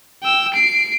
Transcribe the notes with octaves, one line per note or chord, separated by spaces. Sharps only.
G5 E6
C7 D7